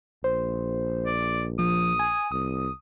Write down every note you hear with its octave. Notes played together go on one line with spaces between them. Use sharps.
A#1 C5
D5
F3 D#6
G#5
C2 D#6